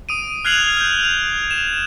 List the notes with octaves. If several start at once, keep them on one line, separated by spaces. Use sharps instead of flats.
D#6 D7 D#7
F6 F#6 G#6 C7 F7 F#7
F6 G6
F7
E7